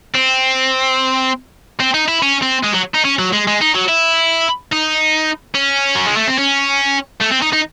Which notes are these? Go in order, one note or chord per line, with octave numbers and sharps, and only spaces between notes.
C4
C4
D#4
E4
C#4
C4
G#3
F#3
D#4
C#4
F#3
G#3
G#3
D#4
F#3
E4
D#4
C#4
F#3
G#3
A3
C4
C#4
A3
C4
D#4
D#4